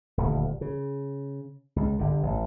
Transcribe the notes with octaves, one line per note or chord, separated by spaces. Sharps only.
D#1 D2
C#3
C#2
G1 D3
A1